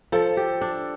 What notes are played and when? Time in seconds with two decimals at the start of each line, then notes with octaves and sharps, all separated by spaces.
0.12 F3 A4
0.37 G4
0.61 D4